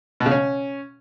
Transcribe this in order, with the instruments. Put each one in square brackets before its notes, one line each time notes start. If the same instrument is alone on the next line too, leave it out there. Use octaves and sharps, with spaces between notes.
[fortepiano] B2
C#3
C#4